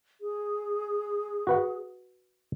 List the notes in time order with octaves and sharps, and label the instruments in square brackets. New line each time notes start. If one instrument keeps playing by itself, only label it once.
[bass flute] G#4
[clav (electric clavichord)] F#4 B4 F#5